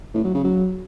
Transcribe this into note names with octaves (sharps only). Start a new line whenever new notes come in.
A2
F#3
C#3
F#3